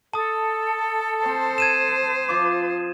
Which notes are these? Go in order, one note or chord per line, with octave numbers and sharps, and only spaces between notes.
A4 A5 D#6
C4 C5
G#6 D#7 E7
F3 D6